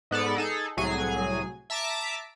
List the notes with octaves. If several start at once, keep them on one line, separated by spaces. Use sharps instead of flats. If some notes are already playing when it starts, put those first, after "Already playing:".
G#2 B3 A4 D5
D#4 G#4 A4
C2 A2 F#3 G#4 G#5
E5 A5 A#5 D6 B6 D7